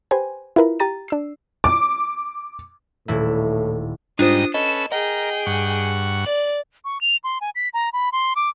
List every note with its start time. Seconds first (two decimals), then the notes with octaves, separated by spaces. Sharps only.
0.11 G4 B4 C5 G#5
0.56 E4 F4 A#4 B4
0.80 G4 A#5 A6 D#7
1.08 D4 E6 C7
1.64 D6
3.08 D#1 A2 E4
4.19 G#2 G3 D4 D#4 F4 C5 D#6
4.54 C#4 A4 B4 D#5 E7
4.92 G#4 A#4 D#5 G5
5.46 G2 F#5 C#6
6.25 D5 F#7
6.85 C#6
7.01 F7
7.24 C6
7.41 G#5
7.55 B6
7.74 A#5
7.93 B5
8.12 C6
8.36 D6